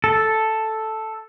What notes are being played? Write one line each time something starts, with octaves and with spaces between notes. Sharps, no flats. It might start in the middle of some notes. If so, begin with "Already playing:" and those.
A4